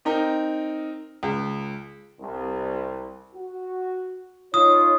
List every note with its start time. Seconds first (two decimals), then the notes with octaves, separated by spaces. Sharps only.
0.05 C4 D#4 A#4
1.23 C#2
2.21 C2
3.35 F#4
4.54 D#4 F4 C#5 D#6